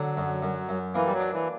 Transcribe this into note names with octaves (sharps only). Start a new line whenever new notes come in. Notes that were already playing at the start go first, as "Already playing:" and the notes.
Already playing: D3 F#3
F#2
F#2
F#2
E3 A#3
G3
F#3
D4
E3